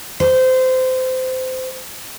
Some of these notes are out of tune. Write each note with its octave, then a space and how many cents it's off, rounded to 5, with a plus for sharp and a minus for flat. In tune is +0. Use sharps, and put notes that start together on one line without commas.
C5 -20